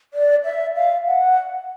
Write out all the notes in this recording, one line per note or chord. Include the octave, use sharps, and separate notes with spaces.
D5
E5
F5
F#5